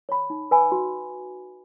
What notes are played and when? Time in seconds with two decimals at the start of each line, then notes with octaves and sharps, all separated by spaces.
0.09 C#5 B5
0.30 D#4
0.51 B4 D#5 G#5 B5
0.72 F#4